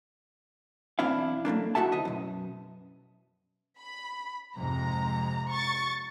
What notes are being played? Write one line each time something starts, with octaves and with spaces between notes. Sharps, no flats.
B1 E2 C4 D4 E4 F5
F#3 A3 A#3 D4
D#4 E4 F#4 A4 E5 A5
D2 D#5 E5
F#2 B2
B5
F2 G#2 C3 A#5
C#6 A6